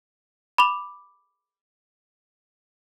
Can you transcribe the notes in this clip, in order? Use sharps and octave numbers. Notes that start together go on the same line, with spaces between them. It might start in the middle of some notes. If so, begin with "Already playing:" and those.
B5 D6 F7